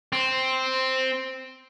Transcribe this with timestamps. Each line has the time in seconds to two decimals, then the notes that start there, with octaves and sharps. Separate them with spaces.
0.12 C4